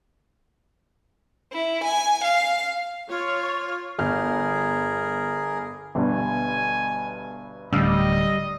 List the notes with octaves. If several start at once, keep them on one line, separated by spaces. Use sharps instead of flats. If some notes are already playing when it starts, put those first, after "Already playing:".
E4
G#5
F5
F4 C#5
G1 G#4 A#4 F6
G1 G2 B2 G#5
D1 D2 G3 D4 D#5 E6 F6 C7